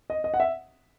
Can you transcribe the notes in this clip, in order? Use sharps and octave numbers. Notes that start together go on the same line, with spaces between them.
D#5
D#5
F#5
E5